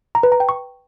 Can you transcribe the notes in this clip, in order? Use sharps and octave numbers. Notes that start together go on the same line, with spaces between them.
A#5
B4
A#5
G5
C#6